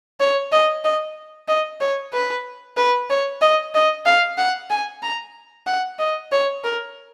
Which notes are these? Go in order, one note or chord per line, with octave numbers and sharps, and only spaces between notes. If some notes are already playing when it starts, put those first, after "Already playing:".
C#5
D#5
D#5
D#5
C#5
B4
B4
C#5
D#5
D#5
F5
F#5
G#5
A#5
F#5
D#5
C#5
A#4